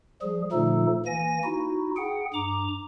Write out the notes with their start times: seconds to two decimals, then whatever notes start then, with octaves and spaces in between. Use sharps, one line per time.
0.22 F3 G3 G#4
0.52 A#2 D3 F3 A3 D#4 A4
1.06 E3 A#3 G#5 A#6
1.44 D#4 E4 F#4
1.97 G#4 F#5 G5
2.34 G2 A#5 D6